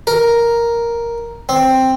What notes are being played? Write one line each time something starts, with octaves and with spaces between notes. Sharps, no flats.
A#4
C4